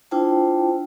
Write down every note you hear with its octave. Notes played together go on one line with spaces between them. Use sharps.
D4 E4 F4 C5 G5 A5